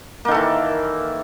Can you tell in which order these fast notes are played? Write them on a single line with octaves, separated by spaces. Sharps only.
A#3 D#3 A4 E3